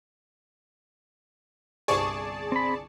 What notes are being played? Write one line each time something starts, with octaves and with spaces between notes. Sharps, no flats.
G1 C2 G#4 D5 A5 C#6
C4 B5